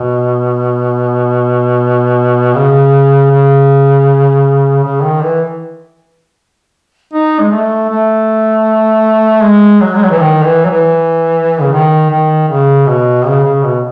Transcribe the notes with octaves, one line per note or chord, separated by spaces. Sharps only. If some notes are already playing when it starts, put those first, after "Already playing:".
Already playing: B2
C#3
C#3
C#3
D#3
E3
D#4
G#3
A3
A3
G#3
F#3
G#3
F#3
E3
D#3
E3
F#3
E3
C#3
D#3
D#3
C#3
B2
C#3
C#3
B2